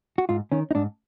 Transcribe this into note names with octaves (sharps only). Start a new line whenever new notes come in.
F#4
G#2 F4
D#3 C#4
D#4
G#2 D4